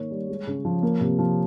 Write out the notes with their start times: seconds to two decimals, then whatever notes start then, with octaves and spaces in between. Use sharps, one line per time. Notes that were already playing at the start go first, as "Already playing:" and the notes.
Already playing: D#3 A#3 C#5
0.11 G3
0.29 G#3
0.47 C#3
0.65 F3
0.83 A#3
1.01 C3
1.18 F3